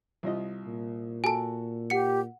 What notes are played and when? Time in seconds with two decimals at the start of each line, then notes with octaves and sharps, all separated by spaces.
0.23 C2 F4 D#5
0.65 A#2
1.24 F#4 A4 G#5 A5
1.90 G4 F#5 C#7